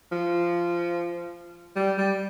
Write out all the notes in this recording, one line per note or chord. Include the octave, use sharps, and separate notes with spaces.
F3
G3
G3